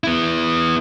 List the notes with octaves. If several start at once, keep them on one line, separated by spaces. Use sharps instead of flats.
B3 E4